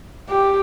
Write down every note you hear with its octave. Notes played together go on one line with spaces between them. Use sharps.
G4